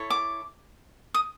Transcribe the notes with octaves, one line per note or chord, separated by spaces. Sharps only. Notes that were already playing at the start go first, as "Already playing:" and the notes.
Already playing: E4 A4 C#5
D6
D#6